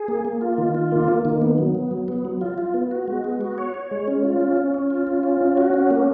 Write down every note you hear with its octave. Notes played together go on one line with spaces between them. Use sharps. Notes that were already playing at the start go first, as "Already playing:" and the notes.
Already playing: G#4
A#3
A#3
F4
D#3
F4
A#3
A#3
D#3
B3
F#3
B3
F#3
B3
F#3
F4
F4
B3
F#4
G#3
B3
F#4
C#5
C#5
G#3
C#4
F4
C#4
C#4
C#4
F4
C#4
F4
C#4
F#4
C#4
A#3